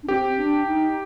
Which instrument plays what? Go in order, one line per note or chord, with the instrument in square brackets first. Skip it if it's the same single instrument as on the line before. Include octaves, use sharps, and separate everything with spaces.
[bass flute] D4
[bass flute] C4 [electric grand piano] G4
[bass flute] D4
D#4